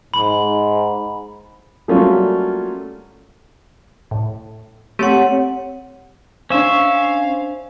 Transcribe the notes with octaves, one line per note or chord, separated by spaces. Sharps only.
G#2 B5
F#3 G3 A3 A#3 C#4 F4
A2
A3 C4 G4 C#5 F#5
C#4 D4 C5 E5 F5